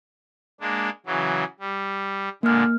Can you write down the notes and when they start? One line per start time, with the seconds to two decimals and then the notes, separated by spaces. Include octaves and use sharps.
0.61 G#3 A#3 D4
1.06 C#3 E3 F#3
1.60 G3
2.43 A#2 D3 G#3 A#3 F6